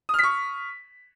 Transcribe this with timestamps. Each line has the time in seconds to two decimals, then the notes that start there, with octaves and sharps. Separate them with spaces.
0.09 D#6
0.14 F6
0.19 B6
0.23 C#6